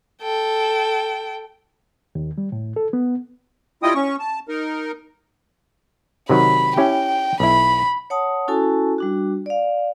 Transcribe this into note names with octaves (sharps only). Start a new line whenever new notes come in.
A4 G5
D#2
G3
A2
A4
B3
G3 E4 F4 D#5 G5 D#6
C#4 C#6
A5
D#4 A#4
C3 D#3 F#3 B5
C#4 E4 G4 G5
B1 E4 B5
C#5 F#5 A5 D#6
C#4 E4 F#4 A4 G#5 A5
G3 D4 F#4
D5 F5